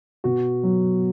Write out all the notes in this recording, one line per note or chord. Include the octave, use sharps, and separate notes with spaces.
B2 F#4
F#3